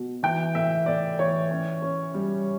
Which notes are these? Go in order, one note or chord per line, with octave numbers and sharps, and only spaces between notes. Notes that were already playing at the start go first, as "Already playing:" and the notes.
Already playing: B2
E3 G5
A2 E5
A2 D5
E3 C#5
C#4
C#4
G3